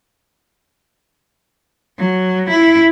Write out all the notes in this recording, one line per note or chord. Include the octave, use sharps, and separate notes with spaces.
F#3
E4